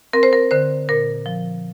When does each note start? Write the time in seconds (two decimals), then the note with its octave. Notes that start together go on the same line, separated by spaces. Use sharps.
0.13 C4 A#4
0.23 C5
0.33 A#4
0.51 D3 C5
0.89 A#2 A#4
1.26 F3